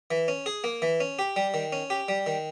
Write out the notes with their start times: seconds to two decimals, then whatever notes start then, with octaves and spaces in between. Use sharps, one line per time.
0.11 E3
0.28 C#4
0.46 G#4
0.64 A#3
0.82 E3
1.00 C#4
1.19 G4
1.36 G3
1.54 D#3
1.72 C#4
1.90 G4
2.08 G3
2.27 D#3